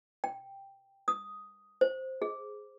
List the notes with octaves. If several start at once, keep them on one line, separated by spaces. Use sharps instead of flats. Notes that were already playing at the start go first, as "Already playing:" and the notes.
G5
D#6
C5
G#4